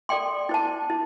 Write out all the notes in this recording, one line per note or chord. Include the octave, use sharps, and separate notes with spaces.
A4 D5 G5 C6
E4 C5 A5
E4